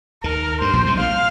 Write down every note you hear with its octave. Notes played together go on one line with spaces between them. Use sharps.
D#2 D#3 A#4
G2 C5
A#1 A#2
C2 C3
A#1 A#2 F5